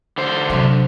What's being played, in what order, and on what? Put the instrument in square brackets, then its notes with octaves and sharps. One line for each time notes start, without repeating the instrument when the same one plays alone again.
[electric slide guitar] D3 C5
[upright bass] C3 F#3